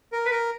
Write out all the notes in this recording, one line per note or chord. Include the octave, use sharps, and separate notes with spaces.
A#4
B4
A#4